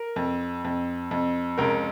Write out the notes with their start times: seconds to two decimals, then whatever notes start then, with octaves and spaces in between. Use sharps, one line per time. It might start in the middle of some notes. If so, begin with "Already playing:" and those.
Already playing: A#4
0.16 F2
0.64 F2
1.11 F2
1.58 C#2 A#4